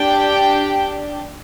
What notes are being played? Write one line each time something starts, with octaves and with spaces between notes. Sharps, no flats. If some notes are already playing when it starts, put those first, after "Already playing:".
Already playing: D4 G4 G5